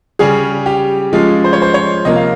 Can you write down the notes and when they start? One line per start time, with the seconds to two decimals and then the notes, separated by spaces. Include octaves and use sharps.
0.19 C#3 G3 C#4 G#4
0.66 G4
1.13 F3 G#3 C#4 F4
1.44 C5
1.53 C#5
1.62 C5
1.74 C#5
2.05 C3 F3 A#3 D#5
2.16 F5